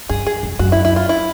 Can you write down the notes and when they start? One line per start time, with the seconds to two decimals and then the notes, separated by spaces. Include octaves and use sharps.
0.09 G2 G#4
0.27 G#4
0.43 F2
0.59 F#2 F#4
0.72 E4
0.85 E4
0.96 F4
1.09 E4